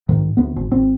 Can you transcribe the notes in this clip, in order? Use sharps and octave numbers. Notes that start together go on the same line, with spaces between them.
B1 G#2 D#3
D2 B3
G#1
G#1 C4